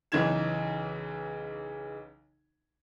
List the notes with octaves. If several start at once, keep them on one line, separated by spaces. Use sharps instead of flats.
B1 C#3 E3 D#4 G#6 E7